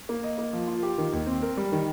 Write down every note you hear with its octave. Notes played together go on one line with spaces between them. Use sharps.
A#3
D#5
A#3
F3
F4
G4
D#3
D#2
C4
A#4
G3
D#3